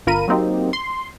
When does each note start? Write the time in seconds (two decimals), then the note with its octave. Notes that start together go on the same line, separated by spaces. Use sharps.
0.07 G1 F4 A#4 B5 D#7
0.28 F#3 A#3 C4 D#4 G4
0.73 C6